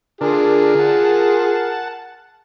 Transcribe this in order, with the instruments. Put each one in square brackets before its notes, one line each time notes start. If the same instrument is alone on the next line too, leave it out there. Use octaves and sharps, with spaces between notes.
[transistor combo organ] D3 D4 [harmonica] F4 G#4 [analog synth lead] A#4
[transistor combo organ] F#5 A5